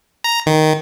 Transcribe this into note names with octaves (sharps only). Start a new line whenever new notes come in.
A#5
D#3